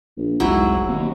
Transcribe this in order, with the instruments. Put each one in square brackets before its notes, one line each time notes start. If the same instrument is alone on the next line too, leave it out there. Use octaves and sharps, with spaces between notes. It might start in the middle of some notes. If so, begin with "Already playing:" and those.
[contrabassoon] A#1
[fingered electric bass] F1 C2 C3 [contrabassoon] G#2 [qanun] F#3 E4
[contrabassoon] C3 [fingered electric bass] D#3 A#3